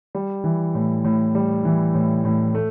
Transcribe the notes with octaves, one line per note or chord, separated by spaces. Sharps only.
G3
E3
A2
A2
G3
E3
A2
A2
A3